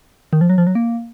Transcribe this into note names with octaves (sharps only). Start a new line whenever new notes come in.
D#3
F3
F#3
F3
F#3
A#3